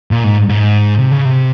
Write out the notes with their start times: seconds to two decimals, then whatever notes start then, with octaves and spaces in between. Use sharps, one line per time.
0.11 A#2
0.24 G#2
0.49 G#2
0.98 C3
1.12 C#3
1.25 C3